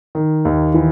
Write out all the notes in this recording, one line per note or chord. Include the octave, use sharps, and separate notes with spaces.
D#3
D#2
E3